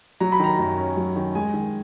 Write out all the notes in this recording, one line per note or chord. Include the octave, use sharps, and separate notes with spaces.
F#3 A#5
B5
D#3 A#5
F#2
C#4
F#3
D#3
G#3 G#5
D#3